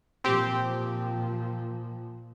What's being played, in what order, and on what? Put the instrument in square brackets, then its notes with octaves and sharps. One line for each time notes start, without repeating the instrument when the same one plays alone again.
[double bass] A#2 F3 [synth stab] C4 G4